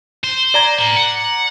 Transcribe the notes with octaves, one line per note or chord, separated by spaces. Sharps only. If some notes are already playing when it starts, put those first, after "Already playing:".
C5
D5 A#5 G#6
A#4 C6
F#5